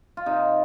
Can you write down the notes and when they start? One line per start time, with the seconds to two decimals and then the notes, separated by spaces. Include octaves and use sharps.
0.17 F4
0.26 C3 D#4